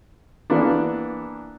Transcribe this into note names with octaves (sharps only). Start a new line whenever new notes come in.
E3 A#3 B3 D4